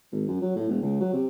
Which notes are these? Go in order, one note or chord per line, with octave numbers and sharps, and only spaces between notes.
G#1
F#2
F#3
A2
E1
C#2
F#3
C3